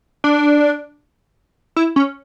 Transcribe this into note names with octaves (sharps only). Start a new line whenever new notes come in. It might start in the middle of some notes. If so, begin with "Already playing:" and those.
D4
E4
C#4